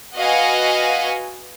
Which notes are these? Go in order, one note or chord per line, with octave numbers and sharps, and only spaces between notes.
F#4 B4 D#5 F5 F#5 G#5